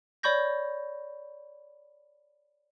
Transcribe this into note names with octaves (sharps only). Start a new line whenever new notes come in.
C#5 D5 B5 C#6 G6 A#6